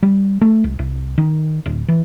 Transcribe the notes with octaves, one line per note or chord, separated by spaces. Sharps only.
G3
A3
C2
C2
D#3
D1
E3